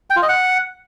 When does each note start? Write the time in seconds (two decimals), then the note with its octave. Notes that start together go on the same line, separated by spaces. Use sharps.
0.10 G5
0.16 F4
0.23 D#5
0.29 F#5